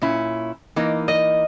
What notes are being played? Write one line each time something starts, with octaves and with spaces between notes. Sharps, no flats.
A#2 C#4 E4
E3 A#3 D#4
D#5